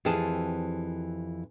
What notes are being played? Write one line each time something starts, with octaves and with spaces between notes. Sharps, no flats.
F2 E3 C4 G4 G#4 A5